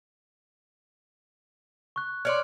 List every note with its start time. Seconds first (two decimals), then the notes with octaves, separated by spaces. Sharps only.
1.96 C#6 F#6
2.25 C#5 D5 C6 F6